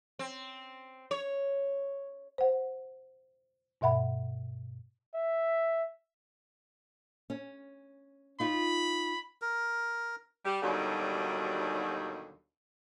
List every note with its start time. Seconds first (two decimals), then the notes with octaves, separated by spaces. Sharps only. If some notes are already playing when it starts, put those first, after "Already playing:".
0.19 C4
1.11 C#5
2.38 C5 F#5
3.81 G2 B2 E5 F#5 B5
5.14 E5
7.30 C#4
8.40 D#4 F4 B5
9.42 A#4
10.45 G3 G4
10.62 D#2 B2 D3 F#3 G3 D#4